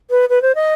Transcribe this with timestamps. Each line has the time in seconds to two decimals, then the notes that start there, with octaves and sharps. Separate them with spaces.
0.10 B4
0.29 B4
0.42 C5
0.55 D#5